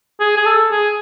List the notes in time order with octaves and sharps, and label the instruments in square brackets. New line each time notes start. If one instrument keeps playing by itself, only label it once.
[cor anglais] G#4
G#4
A4
G#4